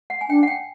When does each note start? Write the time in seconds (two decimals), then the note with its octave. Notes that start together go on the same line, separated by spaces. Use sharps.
0.10 F#5
0.21 G#5
0.29 D4 G5
0.43 F#5
0.48 G5